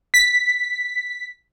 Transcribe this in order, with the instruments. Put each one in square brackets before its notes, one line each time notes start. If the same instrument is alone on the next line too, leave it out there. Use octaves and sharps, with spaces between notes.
[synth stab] B6